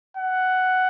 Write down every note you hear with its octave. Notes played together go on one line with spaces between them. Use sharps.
F#5